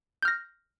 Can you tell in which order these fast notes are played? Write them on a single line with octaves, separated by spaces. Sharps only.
G6 F6 A#6